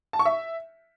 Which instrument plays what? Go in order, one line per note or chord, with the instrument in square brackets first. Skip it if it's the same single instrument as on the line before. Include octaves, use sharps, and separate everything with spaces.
[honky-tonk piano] A5
C#6
E5